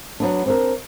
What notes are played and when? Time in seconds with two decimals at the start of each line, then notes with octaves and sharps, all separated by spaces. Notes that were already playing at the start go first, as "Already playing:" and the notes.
0.20 F#3 B3 D4
0.46 C4 D4 A#4